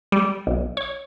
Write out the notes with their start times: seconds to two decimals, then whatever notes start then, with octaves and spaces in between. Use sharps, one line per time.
0.12 G3
0.47 B1
0.77 C#5